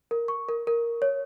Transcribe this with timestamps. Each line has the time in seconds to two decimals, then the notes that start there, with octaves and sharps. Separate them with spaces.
0.11 A#4
0.28 C#6
0.49 A#4
0.67 A#4
1.02 C#5